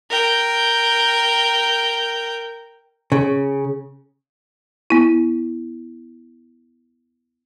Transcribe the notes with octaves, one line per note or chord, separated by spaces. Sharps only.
A#4 G5
C#3
B3 E4